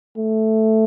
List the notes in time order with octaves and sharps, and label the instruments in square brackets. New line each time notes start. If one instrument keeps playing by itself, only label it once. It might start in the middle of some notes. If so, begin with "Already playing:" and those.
[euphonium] A3